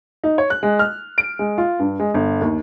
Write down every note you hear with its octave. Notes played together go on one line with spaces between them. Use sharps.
D#4
C#5
F#6
G#3
F6
D7
G#3
F4
G2
G#3
G1
D#2